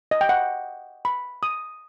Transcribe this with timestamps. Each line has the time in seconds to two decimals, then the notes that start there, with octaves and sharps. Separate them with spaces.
0.11 D#5
0.21 G5
0.29 F#5
1.05 B5
1.43 D#6